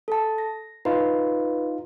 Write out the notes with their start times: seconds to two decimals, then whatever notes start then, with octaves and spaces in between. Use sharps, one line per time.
0.08 A4 A5
0.38 A#6
0.85 D#4 F4 B4